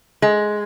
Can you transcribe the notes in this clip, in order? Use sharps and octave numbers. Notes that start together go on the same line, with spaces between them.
G#3